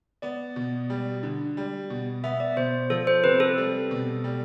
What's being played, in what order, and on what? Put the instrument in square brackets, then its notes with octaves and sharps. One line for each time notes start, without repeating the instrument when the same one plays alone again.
[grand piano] B3 [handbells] D5
[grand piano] B2
G3
D3
G3
B2
[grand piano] B3 [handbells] E5
[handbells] D5
[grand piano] B2 [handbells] C5
[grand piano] F3 [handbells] A4
[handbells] C5
[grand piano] C3 [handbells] B4
[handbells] A4
[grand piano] G3
B2
G3